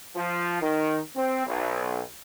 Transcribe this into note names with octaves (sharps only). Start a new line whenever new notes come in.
F3
D#3
C4
B1